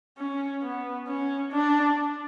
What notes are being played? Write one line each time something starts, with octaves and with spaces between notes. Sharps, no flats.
C#4
B3
C#4
D4